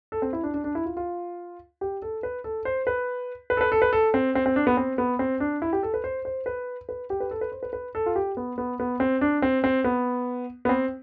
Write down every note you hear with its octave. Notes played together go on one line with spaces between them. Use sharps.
A4
C4
E4
D4
D4
D4
E4
F4
F4
G4
A4
B4
A4
C5
B4
B4
A4
B4
A4
B4
A4
C4
C4
C4
D4
B3
C4
B3
C4
D4
E4
G4
A4
B4
C5
C5
B4
B4
G4
B4
A4
B4
C5
B4
B4
A4
F4
G4
B3
B3
B3
C4
D4
C4
C4
B3
B3
C4